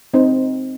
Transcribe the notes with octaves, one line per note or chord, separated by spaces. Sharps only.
C4 D#4 C5